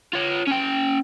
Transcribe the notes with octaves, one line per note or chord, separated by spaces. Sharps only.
F4 C#5
C#4 G5